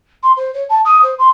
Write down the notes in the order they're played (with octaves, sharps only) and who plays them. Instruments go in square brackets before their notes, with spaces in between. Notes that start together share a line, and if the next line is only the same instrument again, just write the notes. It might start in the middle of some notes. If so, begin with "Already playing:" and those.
[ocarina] C6
C5
C#5
A5
D#6
C5
C6